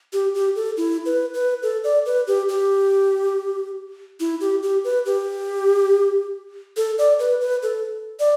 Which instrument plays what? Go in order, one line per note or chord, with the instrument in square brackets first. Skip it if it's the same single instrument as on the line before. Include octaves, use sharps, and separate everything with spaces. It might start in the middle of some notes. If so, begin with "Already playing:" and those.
[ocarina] G4
G4
A4
E4
B4
B4
A4
D5
B4
G4
G4
E4
G4
G4
B4
G4
A4
D5
B4
B4
A4
D5